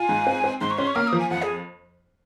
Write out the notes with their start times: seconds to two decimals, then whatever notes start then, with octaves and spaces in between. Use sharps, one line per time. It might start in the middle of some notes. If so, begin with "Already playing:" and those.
Already playing: F4 G#5
0.09 G#2
0.27 C4
0.44 C4
0.61 G#2 C6
0.70 C#6
0.78 C#4 C6
0.87 C#6
0.95 A#3 F6
1.08 F3 D#6
1.19 G#5
1.30 F2 F#5
1.43 G#4